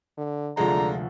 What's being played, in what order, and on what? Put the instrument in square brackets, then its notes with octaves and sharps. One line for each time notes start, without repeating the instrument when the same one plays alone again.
[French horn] D3
[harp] F1 D2 [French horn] D3 [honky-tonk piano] G#3 F4 [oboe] A#5